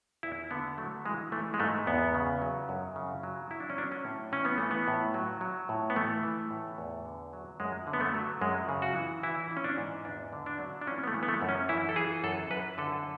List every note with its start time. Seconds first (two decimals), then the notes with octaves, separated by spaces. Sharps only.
0.23 E2 E4
0.51 D3 B3
0.78 F#3 A3
1.05 E3 G#3
1.32 E3 A3
1.54 G#3
1.60 G#2 A3
1.87 E2 B3
2.14 C#3
2.42 F#3
2.69 F#2
2.96 C#3
3.23 F#3
3.51 F#3 E4
3.60 D4
3.70 C#4
3.78 F#3 D4
3.92 C#4
4.05 A2
4.32 E3 C#4
4.45 B3
4.58 E3 A3
4.71 B3
4.88 A2
5.14 F#3
5.41 F#3
5.69 A2
5.90 B3
5.96 E3 A3
6.23 E3
6.51 A2
6.78 E2
7.05 D3
7.33 F#3
7.60 F#2 G#3
7.87 D3
7.93 B3
8.01 A3
8.14 F#3
8.41 F#2 G#3
8.69 C#3
8.82 F#4
8.96 E3
9.23 E3 E4
9.51 E3
9.57 C#4
9.64 D4
9.78 G#2
10.05 E2 D4
10.33 D3
10.46 D4
10.60 F#3
10.81 D4
10.87 E3 C#4
11.03 B3
11.07 A3
11.14 E3
11.23 B3
11.28 A3
11.42 F#2
11.49 C#4
11.69 E3 E4
11.89 A4
11.96 E3 G#4
12.24 F#2 A4
12.50 F#2 B4
12.78 D3 A4